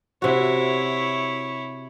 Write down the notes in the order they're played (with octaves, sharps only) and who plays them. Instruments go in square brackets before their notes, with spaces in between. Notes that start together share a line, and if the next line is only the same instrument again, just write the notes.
[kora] C3 F#4 [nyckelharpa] E4 C#5